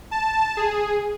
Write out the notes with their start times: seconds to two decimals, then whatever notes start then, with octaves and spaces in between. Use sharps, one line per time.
0.11 A5
0.57 G#4